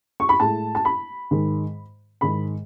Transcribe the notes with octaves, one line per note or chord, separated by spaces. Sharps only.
C#6
B5
A2 G#3 A5
A5
B5
G#2 D#3 G#3
G#2 D#3 G#3 B5